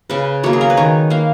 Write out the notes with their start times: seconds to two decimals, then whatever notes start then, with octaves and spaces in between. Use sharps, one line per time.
0.10 C#3 B4
0.44 F#3 A#3 C#5
0.53 G#4
0.61 A#4
0.70 B4
0.77 D#3 C#5
1.10 A#3 F5